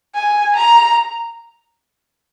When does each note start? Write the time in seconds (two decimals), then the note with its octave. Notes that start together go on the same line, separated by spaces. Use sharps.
0.15 G#5
0.56 A#5